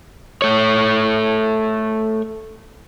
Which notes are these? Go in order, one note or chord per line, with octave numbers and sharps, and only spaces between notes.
A3 C#5